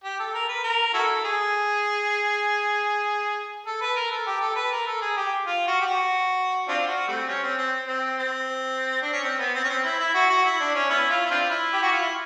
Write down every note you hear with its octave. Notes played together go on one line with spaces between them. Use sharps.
G4
A4
A#4
B4
A#4
E4 F#4 A4
G#4
A4
B4
A#4
A4
G4
A4
B4
A#4
A4
G#4
G4
F4
F#4
G4
F#4
C4 D4 F4
F#4
G3 A3 C4
C#4
C4
C4
C4
C4
D4
C#4
C4
B3
C4
C#4
C4
E4
E4
F#4
F#4
E4
D4
C#4
B3 C#4 E4
F4
E4
C4 D4 F4
E4
G4
F#4
F4
E4